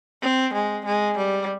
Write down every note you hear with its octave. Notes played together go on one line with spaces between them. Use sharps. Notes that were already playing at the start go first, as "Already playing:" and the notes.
C4
G#3
G#3
G3